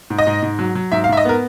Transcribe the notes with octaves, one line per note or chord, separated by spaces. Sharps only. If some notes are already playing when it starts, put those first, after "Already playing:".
G#2
D#5
G#2
G#2
F#3
F#3
G#2 E5
F5
G#2 E5
D#5
B3 A#4